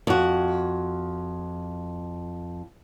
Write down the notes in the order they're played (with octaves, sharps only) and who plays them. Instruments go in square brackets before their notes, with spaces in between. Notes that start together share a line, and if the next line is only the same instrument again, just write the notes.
[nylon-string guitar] F2 F#4